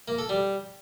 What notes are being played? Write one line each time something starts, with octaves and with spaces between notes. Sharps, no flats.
A#3
A4
G3